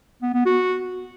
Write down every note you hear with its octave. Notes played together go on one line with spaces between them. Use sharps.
B3
B3
F#4